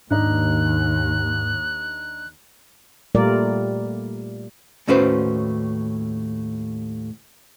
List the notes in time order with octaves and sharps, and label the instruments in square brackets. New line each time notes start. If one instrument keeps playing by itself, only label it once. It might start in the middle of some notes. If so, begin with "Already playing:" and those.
[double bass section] D#2 [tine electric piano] G#2 [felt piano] D4 D#4 [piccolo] F#6
[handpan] A#2 G3 A3 F4 A#4 D5
[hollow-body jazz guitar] D#2 A2 C#4 F#4 B4 C5